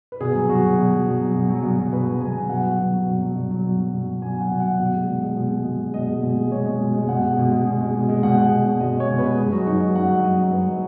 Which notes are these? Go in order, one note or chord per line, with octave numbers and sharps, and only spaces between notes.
B4
B2 G#4
F#3
B2 F#4
F#3
B2
F#3
B2
F#3
B2
F#3
B2
F#3
B2 B4
F#3
B2 G#5
F#3
B2 F#5
F#3
B2
F#3
B2
F#3
B2
F#3
B2
F#3
B2
F#3
B2 G#5
F#3 F#5
B2
F#5
F#3
B2
G#3
B2
G#3
B2
G#3
B2
G#3
B2 D#5
G#3
B2
G#3
B2 C#5
G#3
B2
G#3
B2 F#5
G#3
B2
G#3
B2
G#3
B2
G#3
B2 F#5
G#3
B2
G#3
B2 D#5
G#3
C#5
B2
B4
G#3
F#2 G#4
F#3 F#4
F#2 D#4
F#3 F#4
F#2 F#5
F#3
F#2 D#5
F#3
F#2 B4
F#3